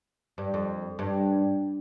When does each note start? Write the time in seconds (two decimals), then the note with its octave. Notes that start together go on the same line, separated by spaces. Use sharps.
0.38 G2
0.54 F2
0.99 G2